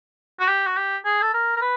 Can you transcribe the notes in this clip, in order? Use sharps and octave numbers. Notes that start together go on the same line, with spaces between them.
F#4
G4
F#4
G4
G#4
A4
A#4
A#4
B4